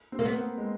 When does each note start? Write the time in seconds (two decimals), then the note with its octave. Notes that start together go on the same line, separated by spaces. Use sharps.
0.12 C4
0.19 A#3
0.25 B3
0.34 A#3
0.38 B3
0.58 G#3